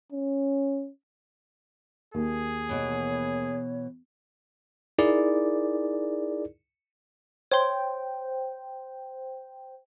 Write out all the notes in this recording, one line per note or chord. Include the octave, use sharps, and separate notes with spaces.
C#4
D#2 G#4
B2 E3 C#5
D#4 E4 G#4 A#4 D5
C5 C#5 G5 C6